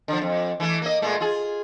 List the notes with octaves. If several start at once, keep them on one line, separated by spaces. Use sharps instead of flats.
D3 F3
F2
E3 A3
A#3 D#5
A#2 G#3 A3
F4 G#4